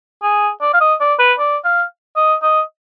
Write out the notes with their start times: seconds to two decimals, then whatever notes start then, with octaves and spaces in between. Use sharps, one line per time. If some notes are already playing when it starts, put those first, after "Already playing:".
0.23 G#4
0.62 D5
0.74 F5
0.81 D#5
1.01 D5
1.19 B4
1.39 D5
1.65 F5
2.16 D#5
2.42 D#5